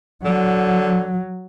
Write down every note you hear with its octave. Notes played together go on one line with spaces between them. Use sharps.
D3 F#3